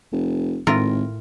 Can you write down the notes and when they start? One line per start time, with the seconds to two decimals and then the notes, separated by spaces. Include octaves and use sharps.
0.12 F1
0.67 G#1 A2 F4 A#4